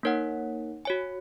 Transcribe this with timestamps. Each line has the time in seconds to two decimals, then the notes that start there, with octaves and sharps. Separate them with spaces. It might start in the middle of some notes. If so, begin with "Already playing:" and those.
0.03 A#3 D#4 A#4 C#5 F#5
0.85 F#4 C#5 G#5